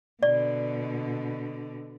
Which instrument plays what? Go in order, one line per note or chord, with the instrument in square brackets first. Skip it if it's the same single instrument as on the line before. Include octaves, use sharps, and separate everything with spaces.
[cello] B2 D3 [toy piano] D5